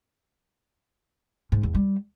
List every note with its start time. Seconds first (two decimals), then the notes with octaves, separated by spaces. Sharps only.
1.52 G#2
1.63 E2
1.75 G3